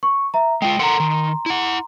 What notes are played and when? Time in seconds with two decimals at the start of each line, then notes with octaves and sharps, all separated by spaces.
0.03 C#6
0.34 E5 A#5
0.62 G#3 F4 G5
0.79 A4 A#4 F#5 A#5 C6
1.00 D#3
1.46 E4 F#5